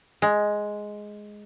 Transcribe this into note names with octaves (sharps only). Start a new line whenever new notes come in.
G#3